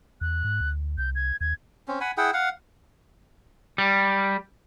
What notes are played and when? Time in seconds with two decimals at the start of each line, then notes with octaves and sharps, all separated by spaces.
0.21 E2 F#6
0.44 G#2
0.60 D2
0.98 C2 G6
1.15 G#6
1.41 D#2 G#6
1.88 C4 C#4
2.01 F#5 G#5 B5
2.17 E4 G#4 F#5 G5
2.34 F5 F#5
3.78 G3